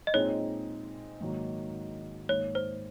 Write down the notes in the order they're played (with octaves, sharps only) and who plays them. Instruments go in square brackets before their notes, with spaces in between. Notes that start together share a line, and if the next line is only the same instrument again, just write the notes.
[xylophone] D#5
[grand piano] A#2 G#3 C4 D#4 [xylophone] C#5
[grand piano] G#2 D#3 F#3 A#3
[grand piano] G#2 D#3 A#3 D#4 [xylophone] C#5
[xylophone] C5